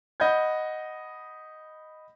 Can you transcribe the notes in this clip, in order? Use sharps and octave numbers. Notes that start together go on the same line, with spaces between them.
D#5 F#5 B5 G6 G#6